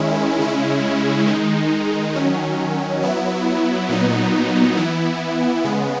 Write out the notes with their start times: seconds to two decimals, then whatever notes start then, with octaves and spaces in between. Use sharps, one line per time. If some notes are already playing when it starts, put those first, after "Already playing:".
Already playing: D#3 G#3 C#4 E4
0.39 C#3 G#3 C#4 E4
1.26 D#3 G#3 D#4
2.14 D#3 F#3 C#4
3.02 F#3 B3 E4
3.89 A#2 F#3 B3 D#4
4.77 E3 B3 E4
5.64 C#3 G#3 B3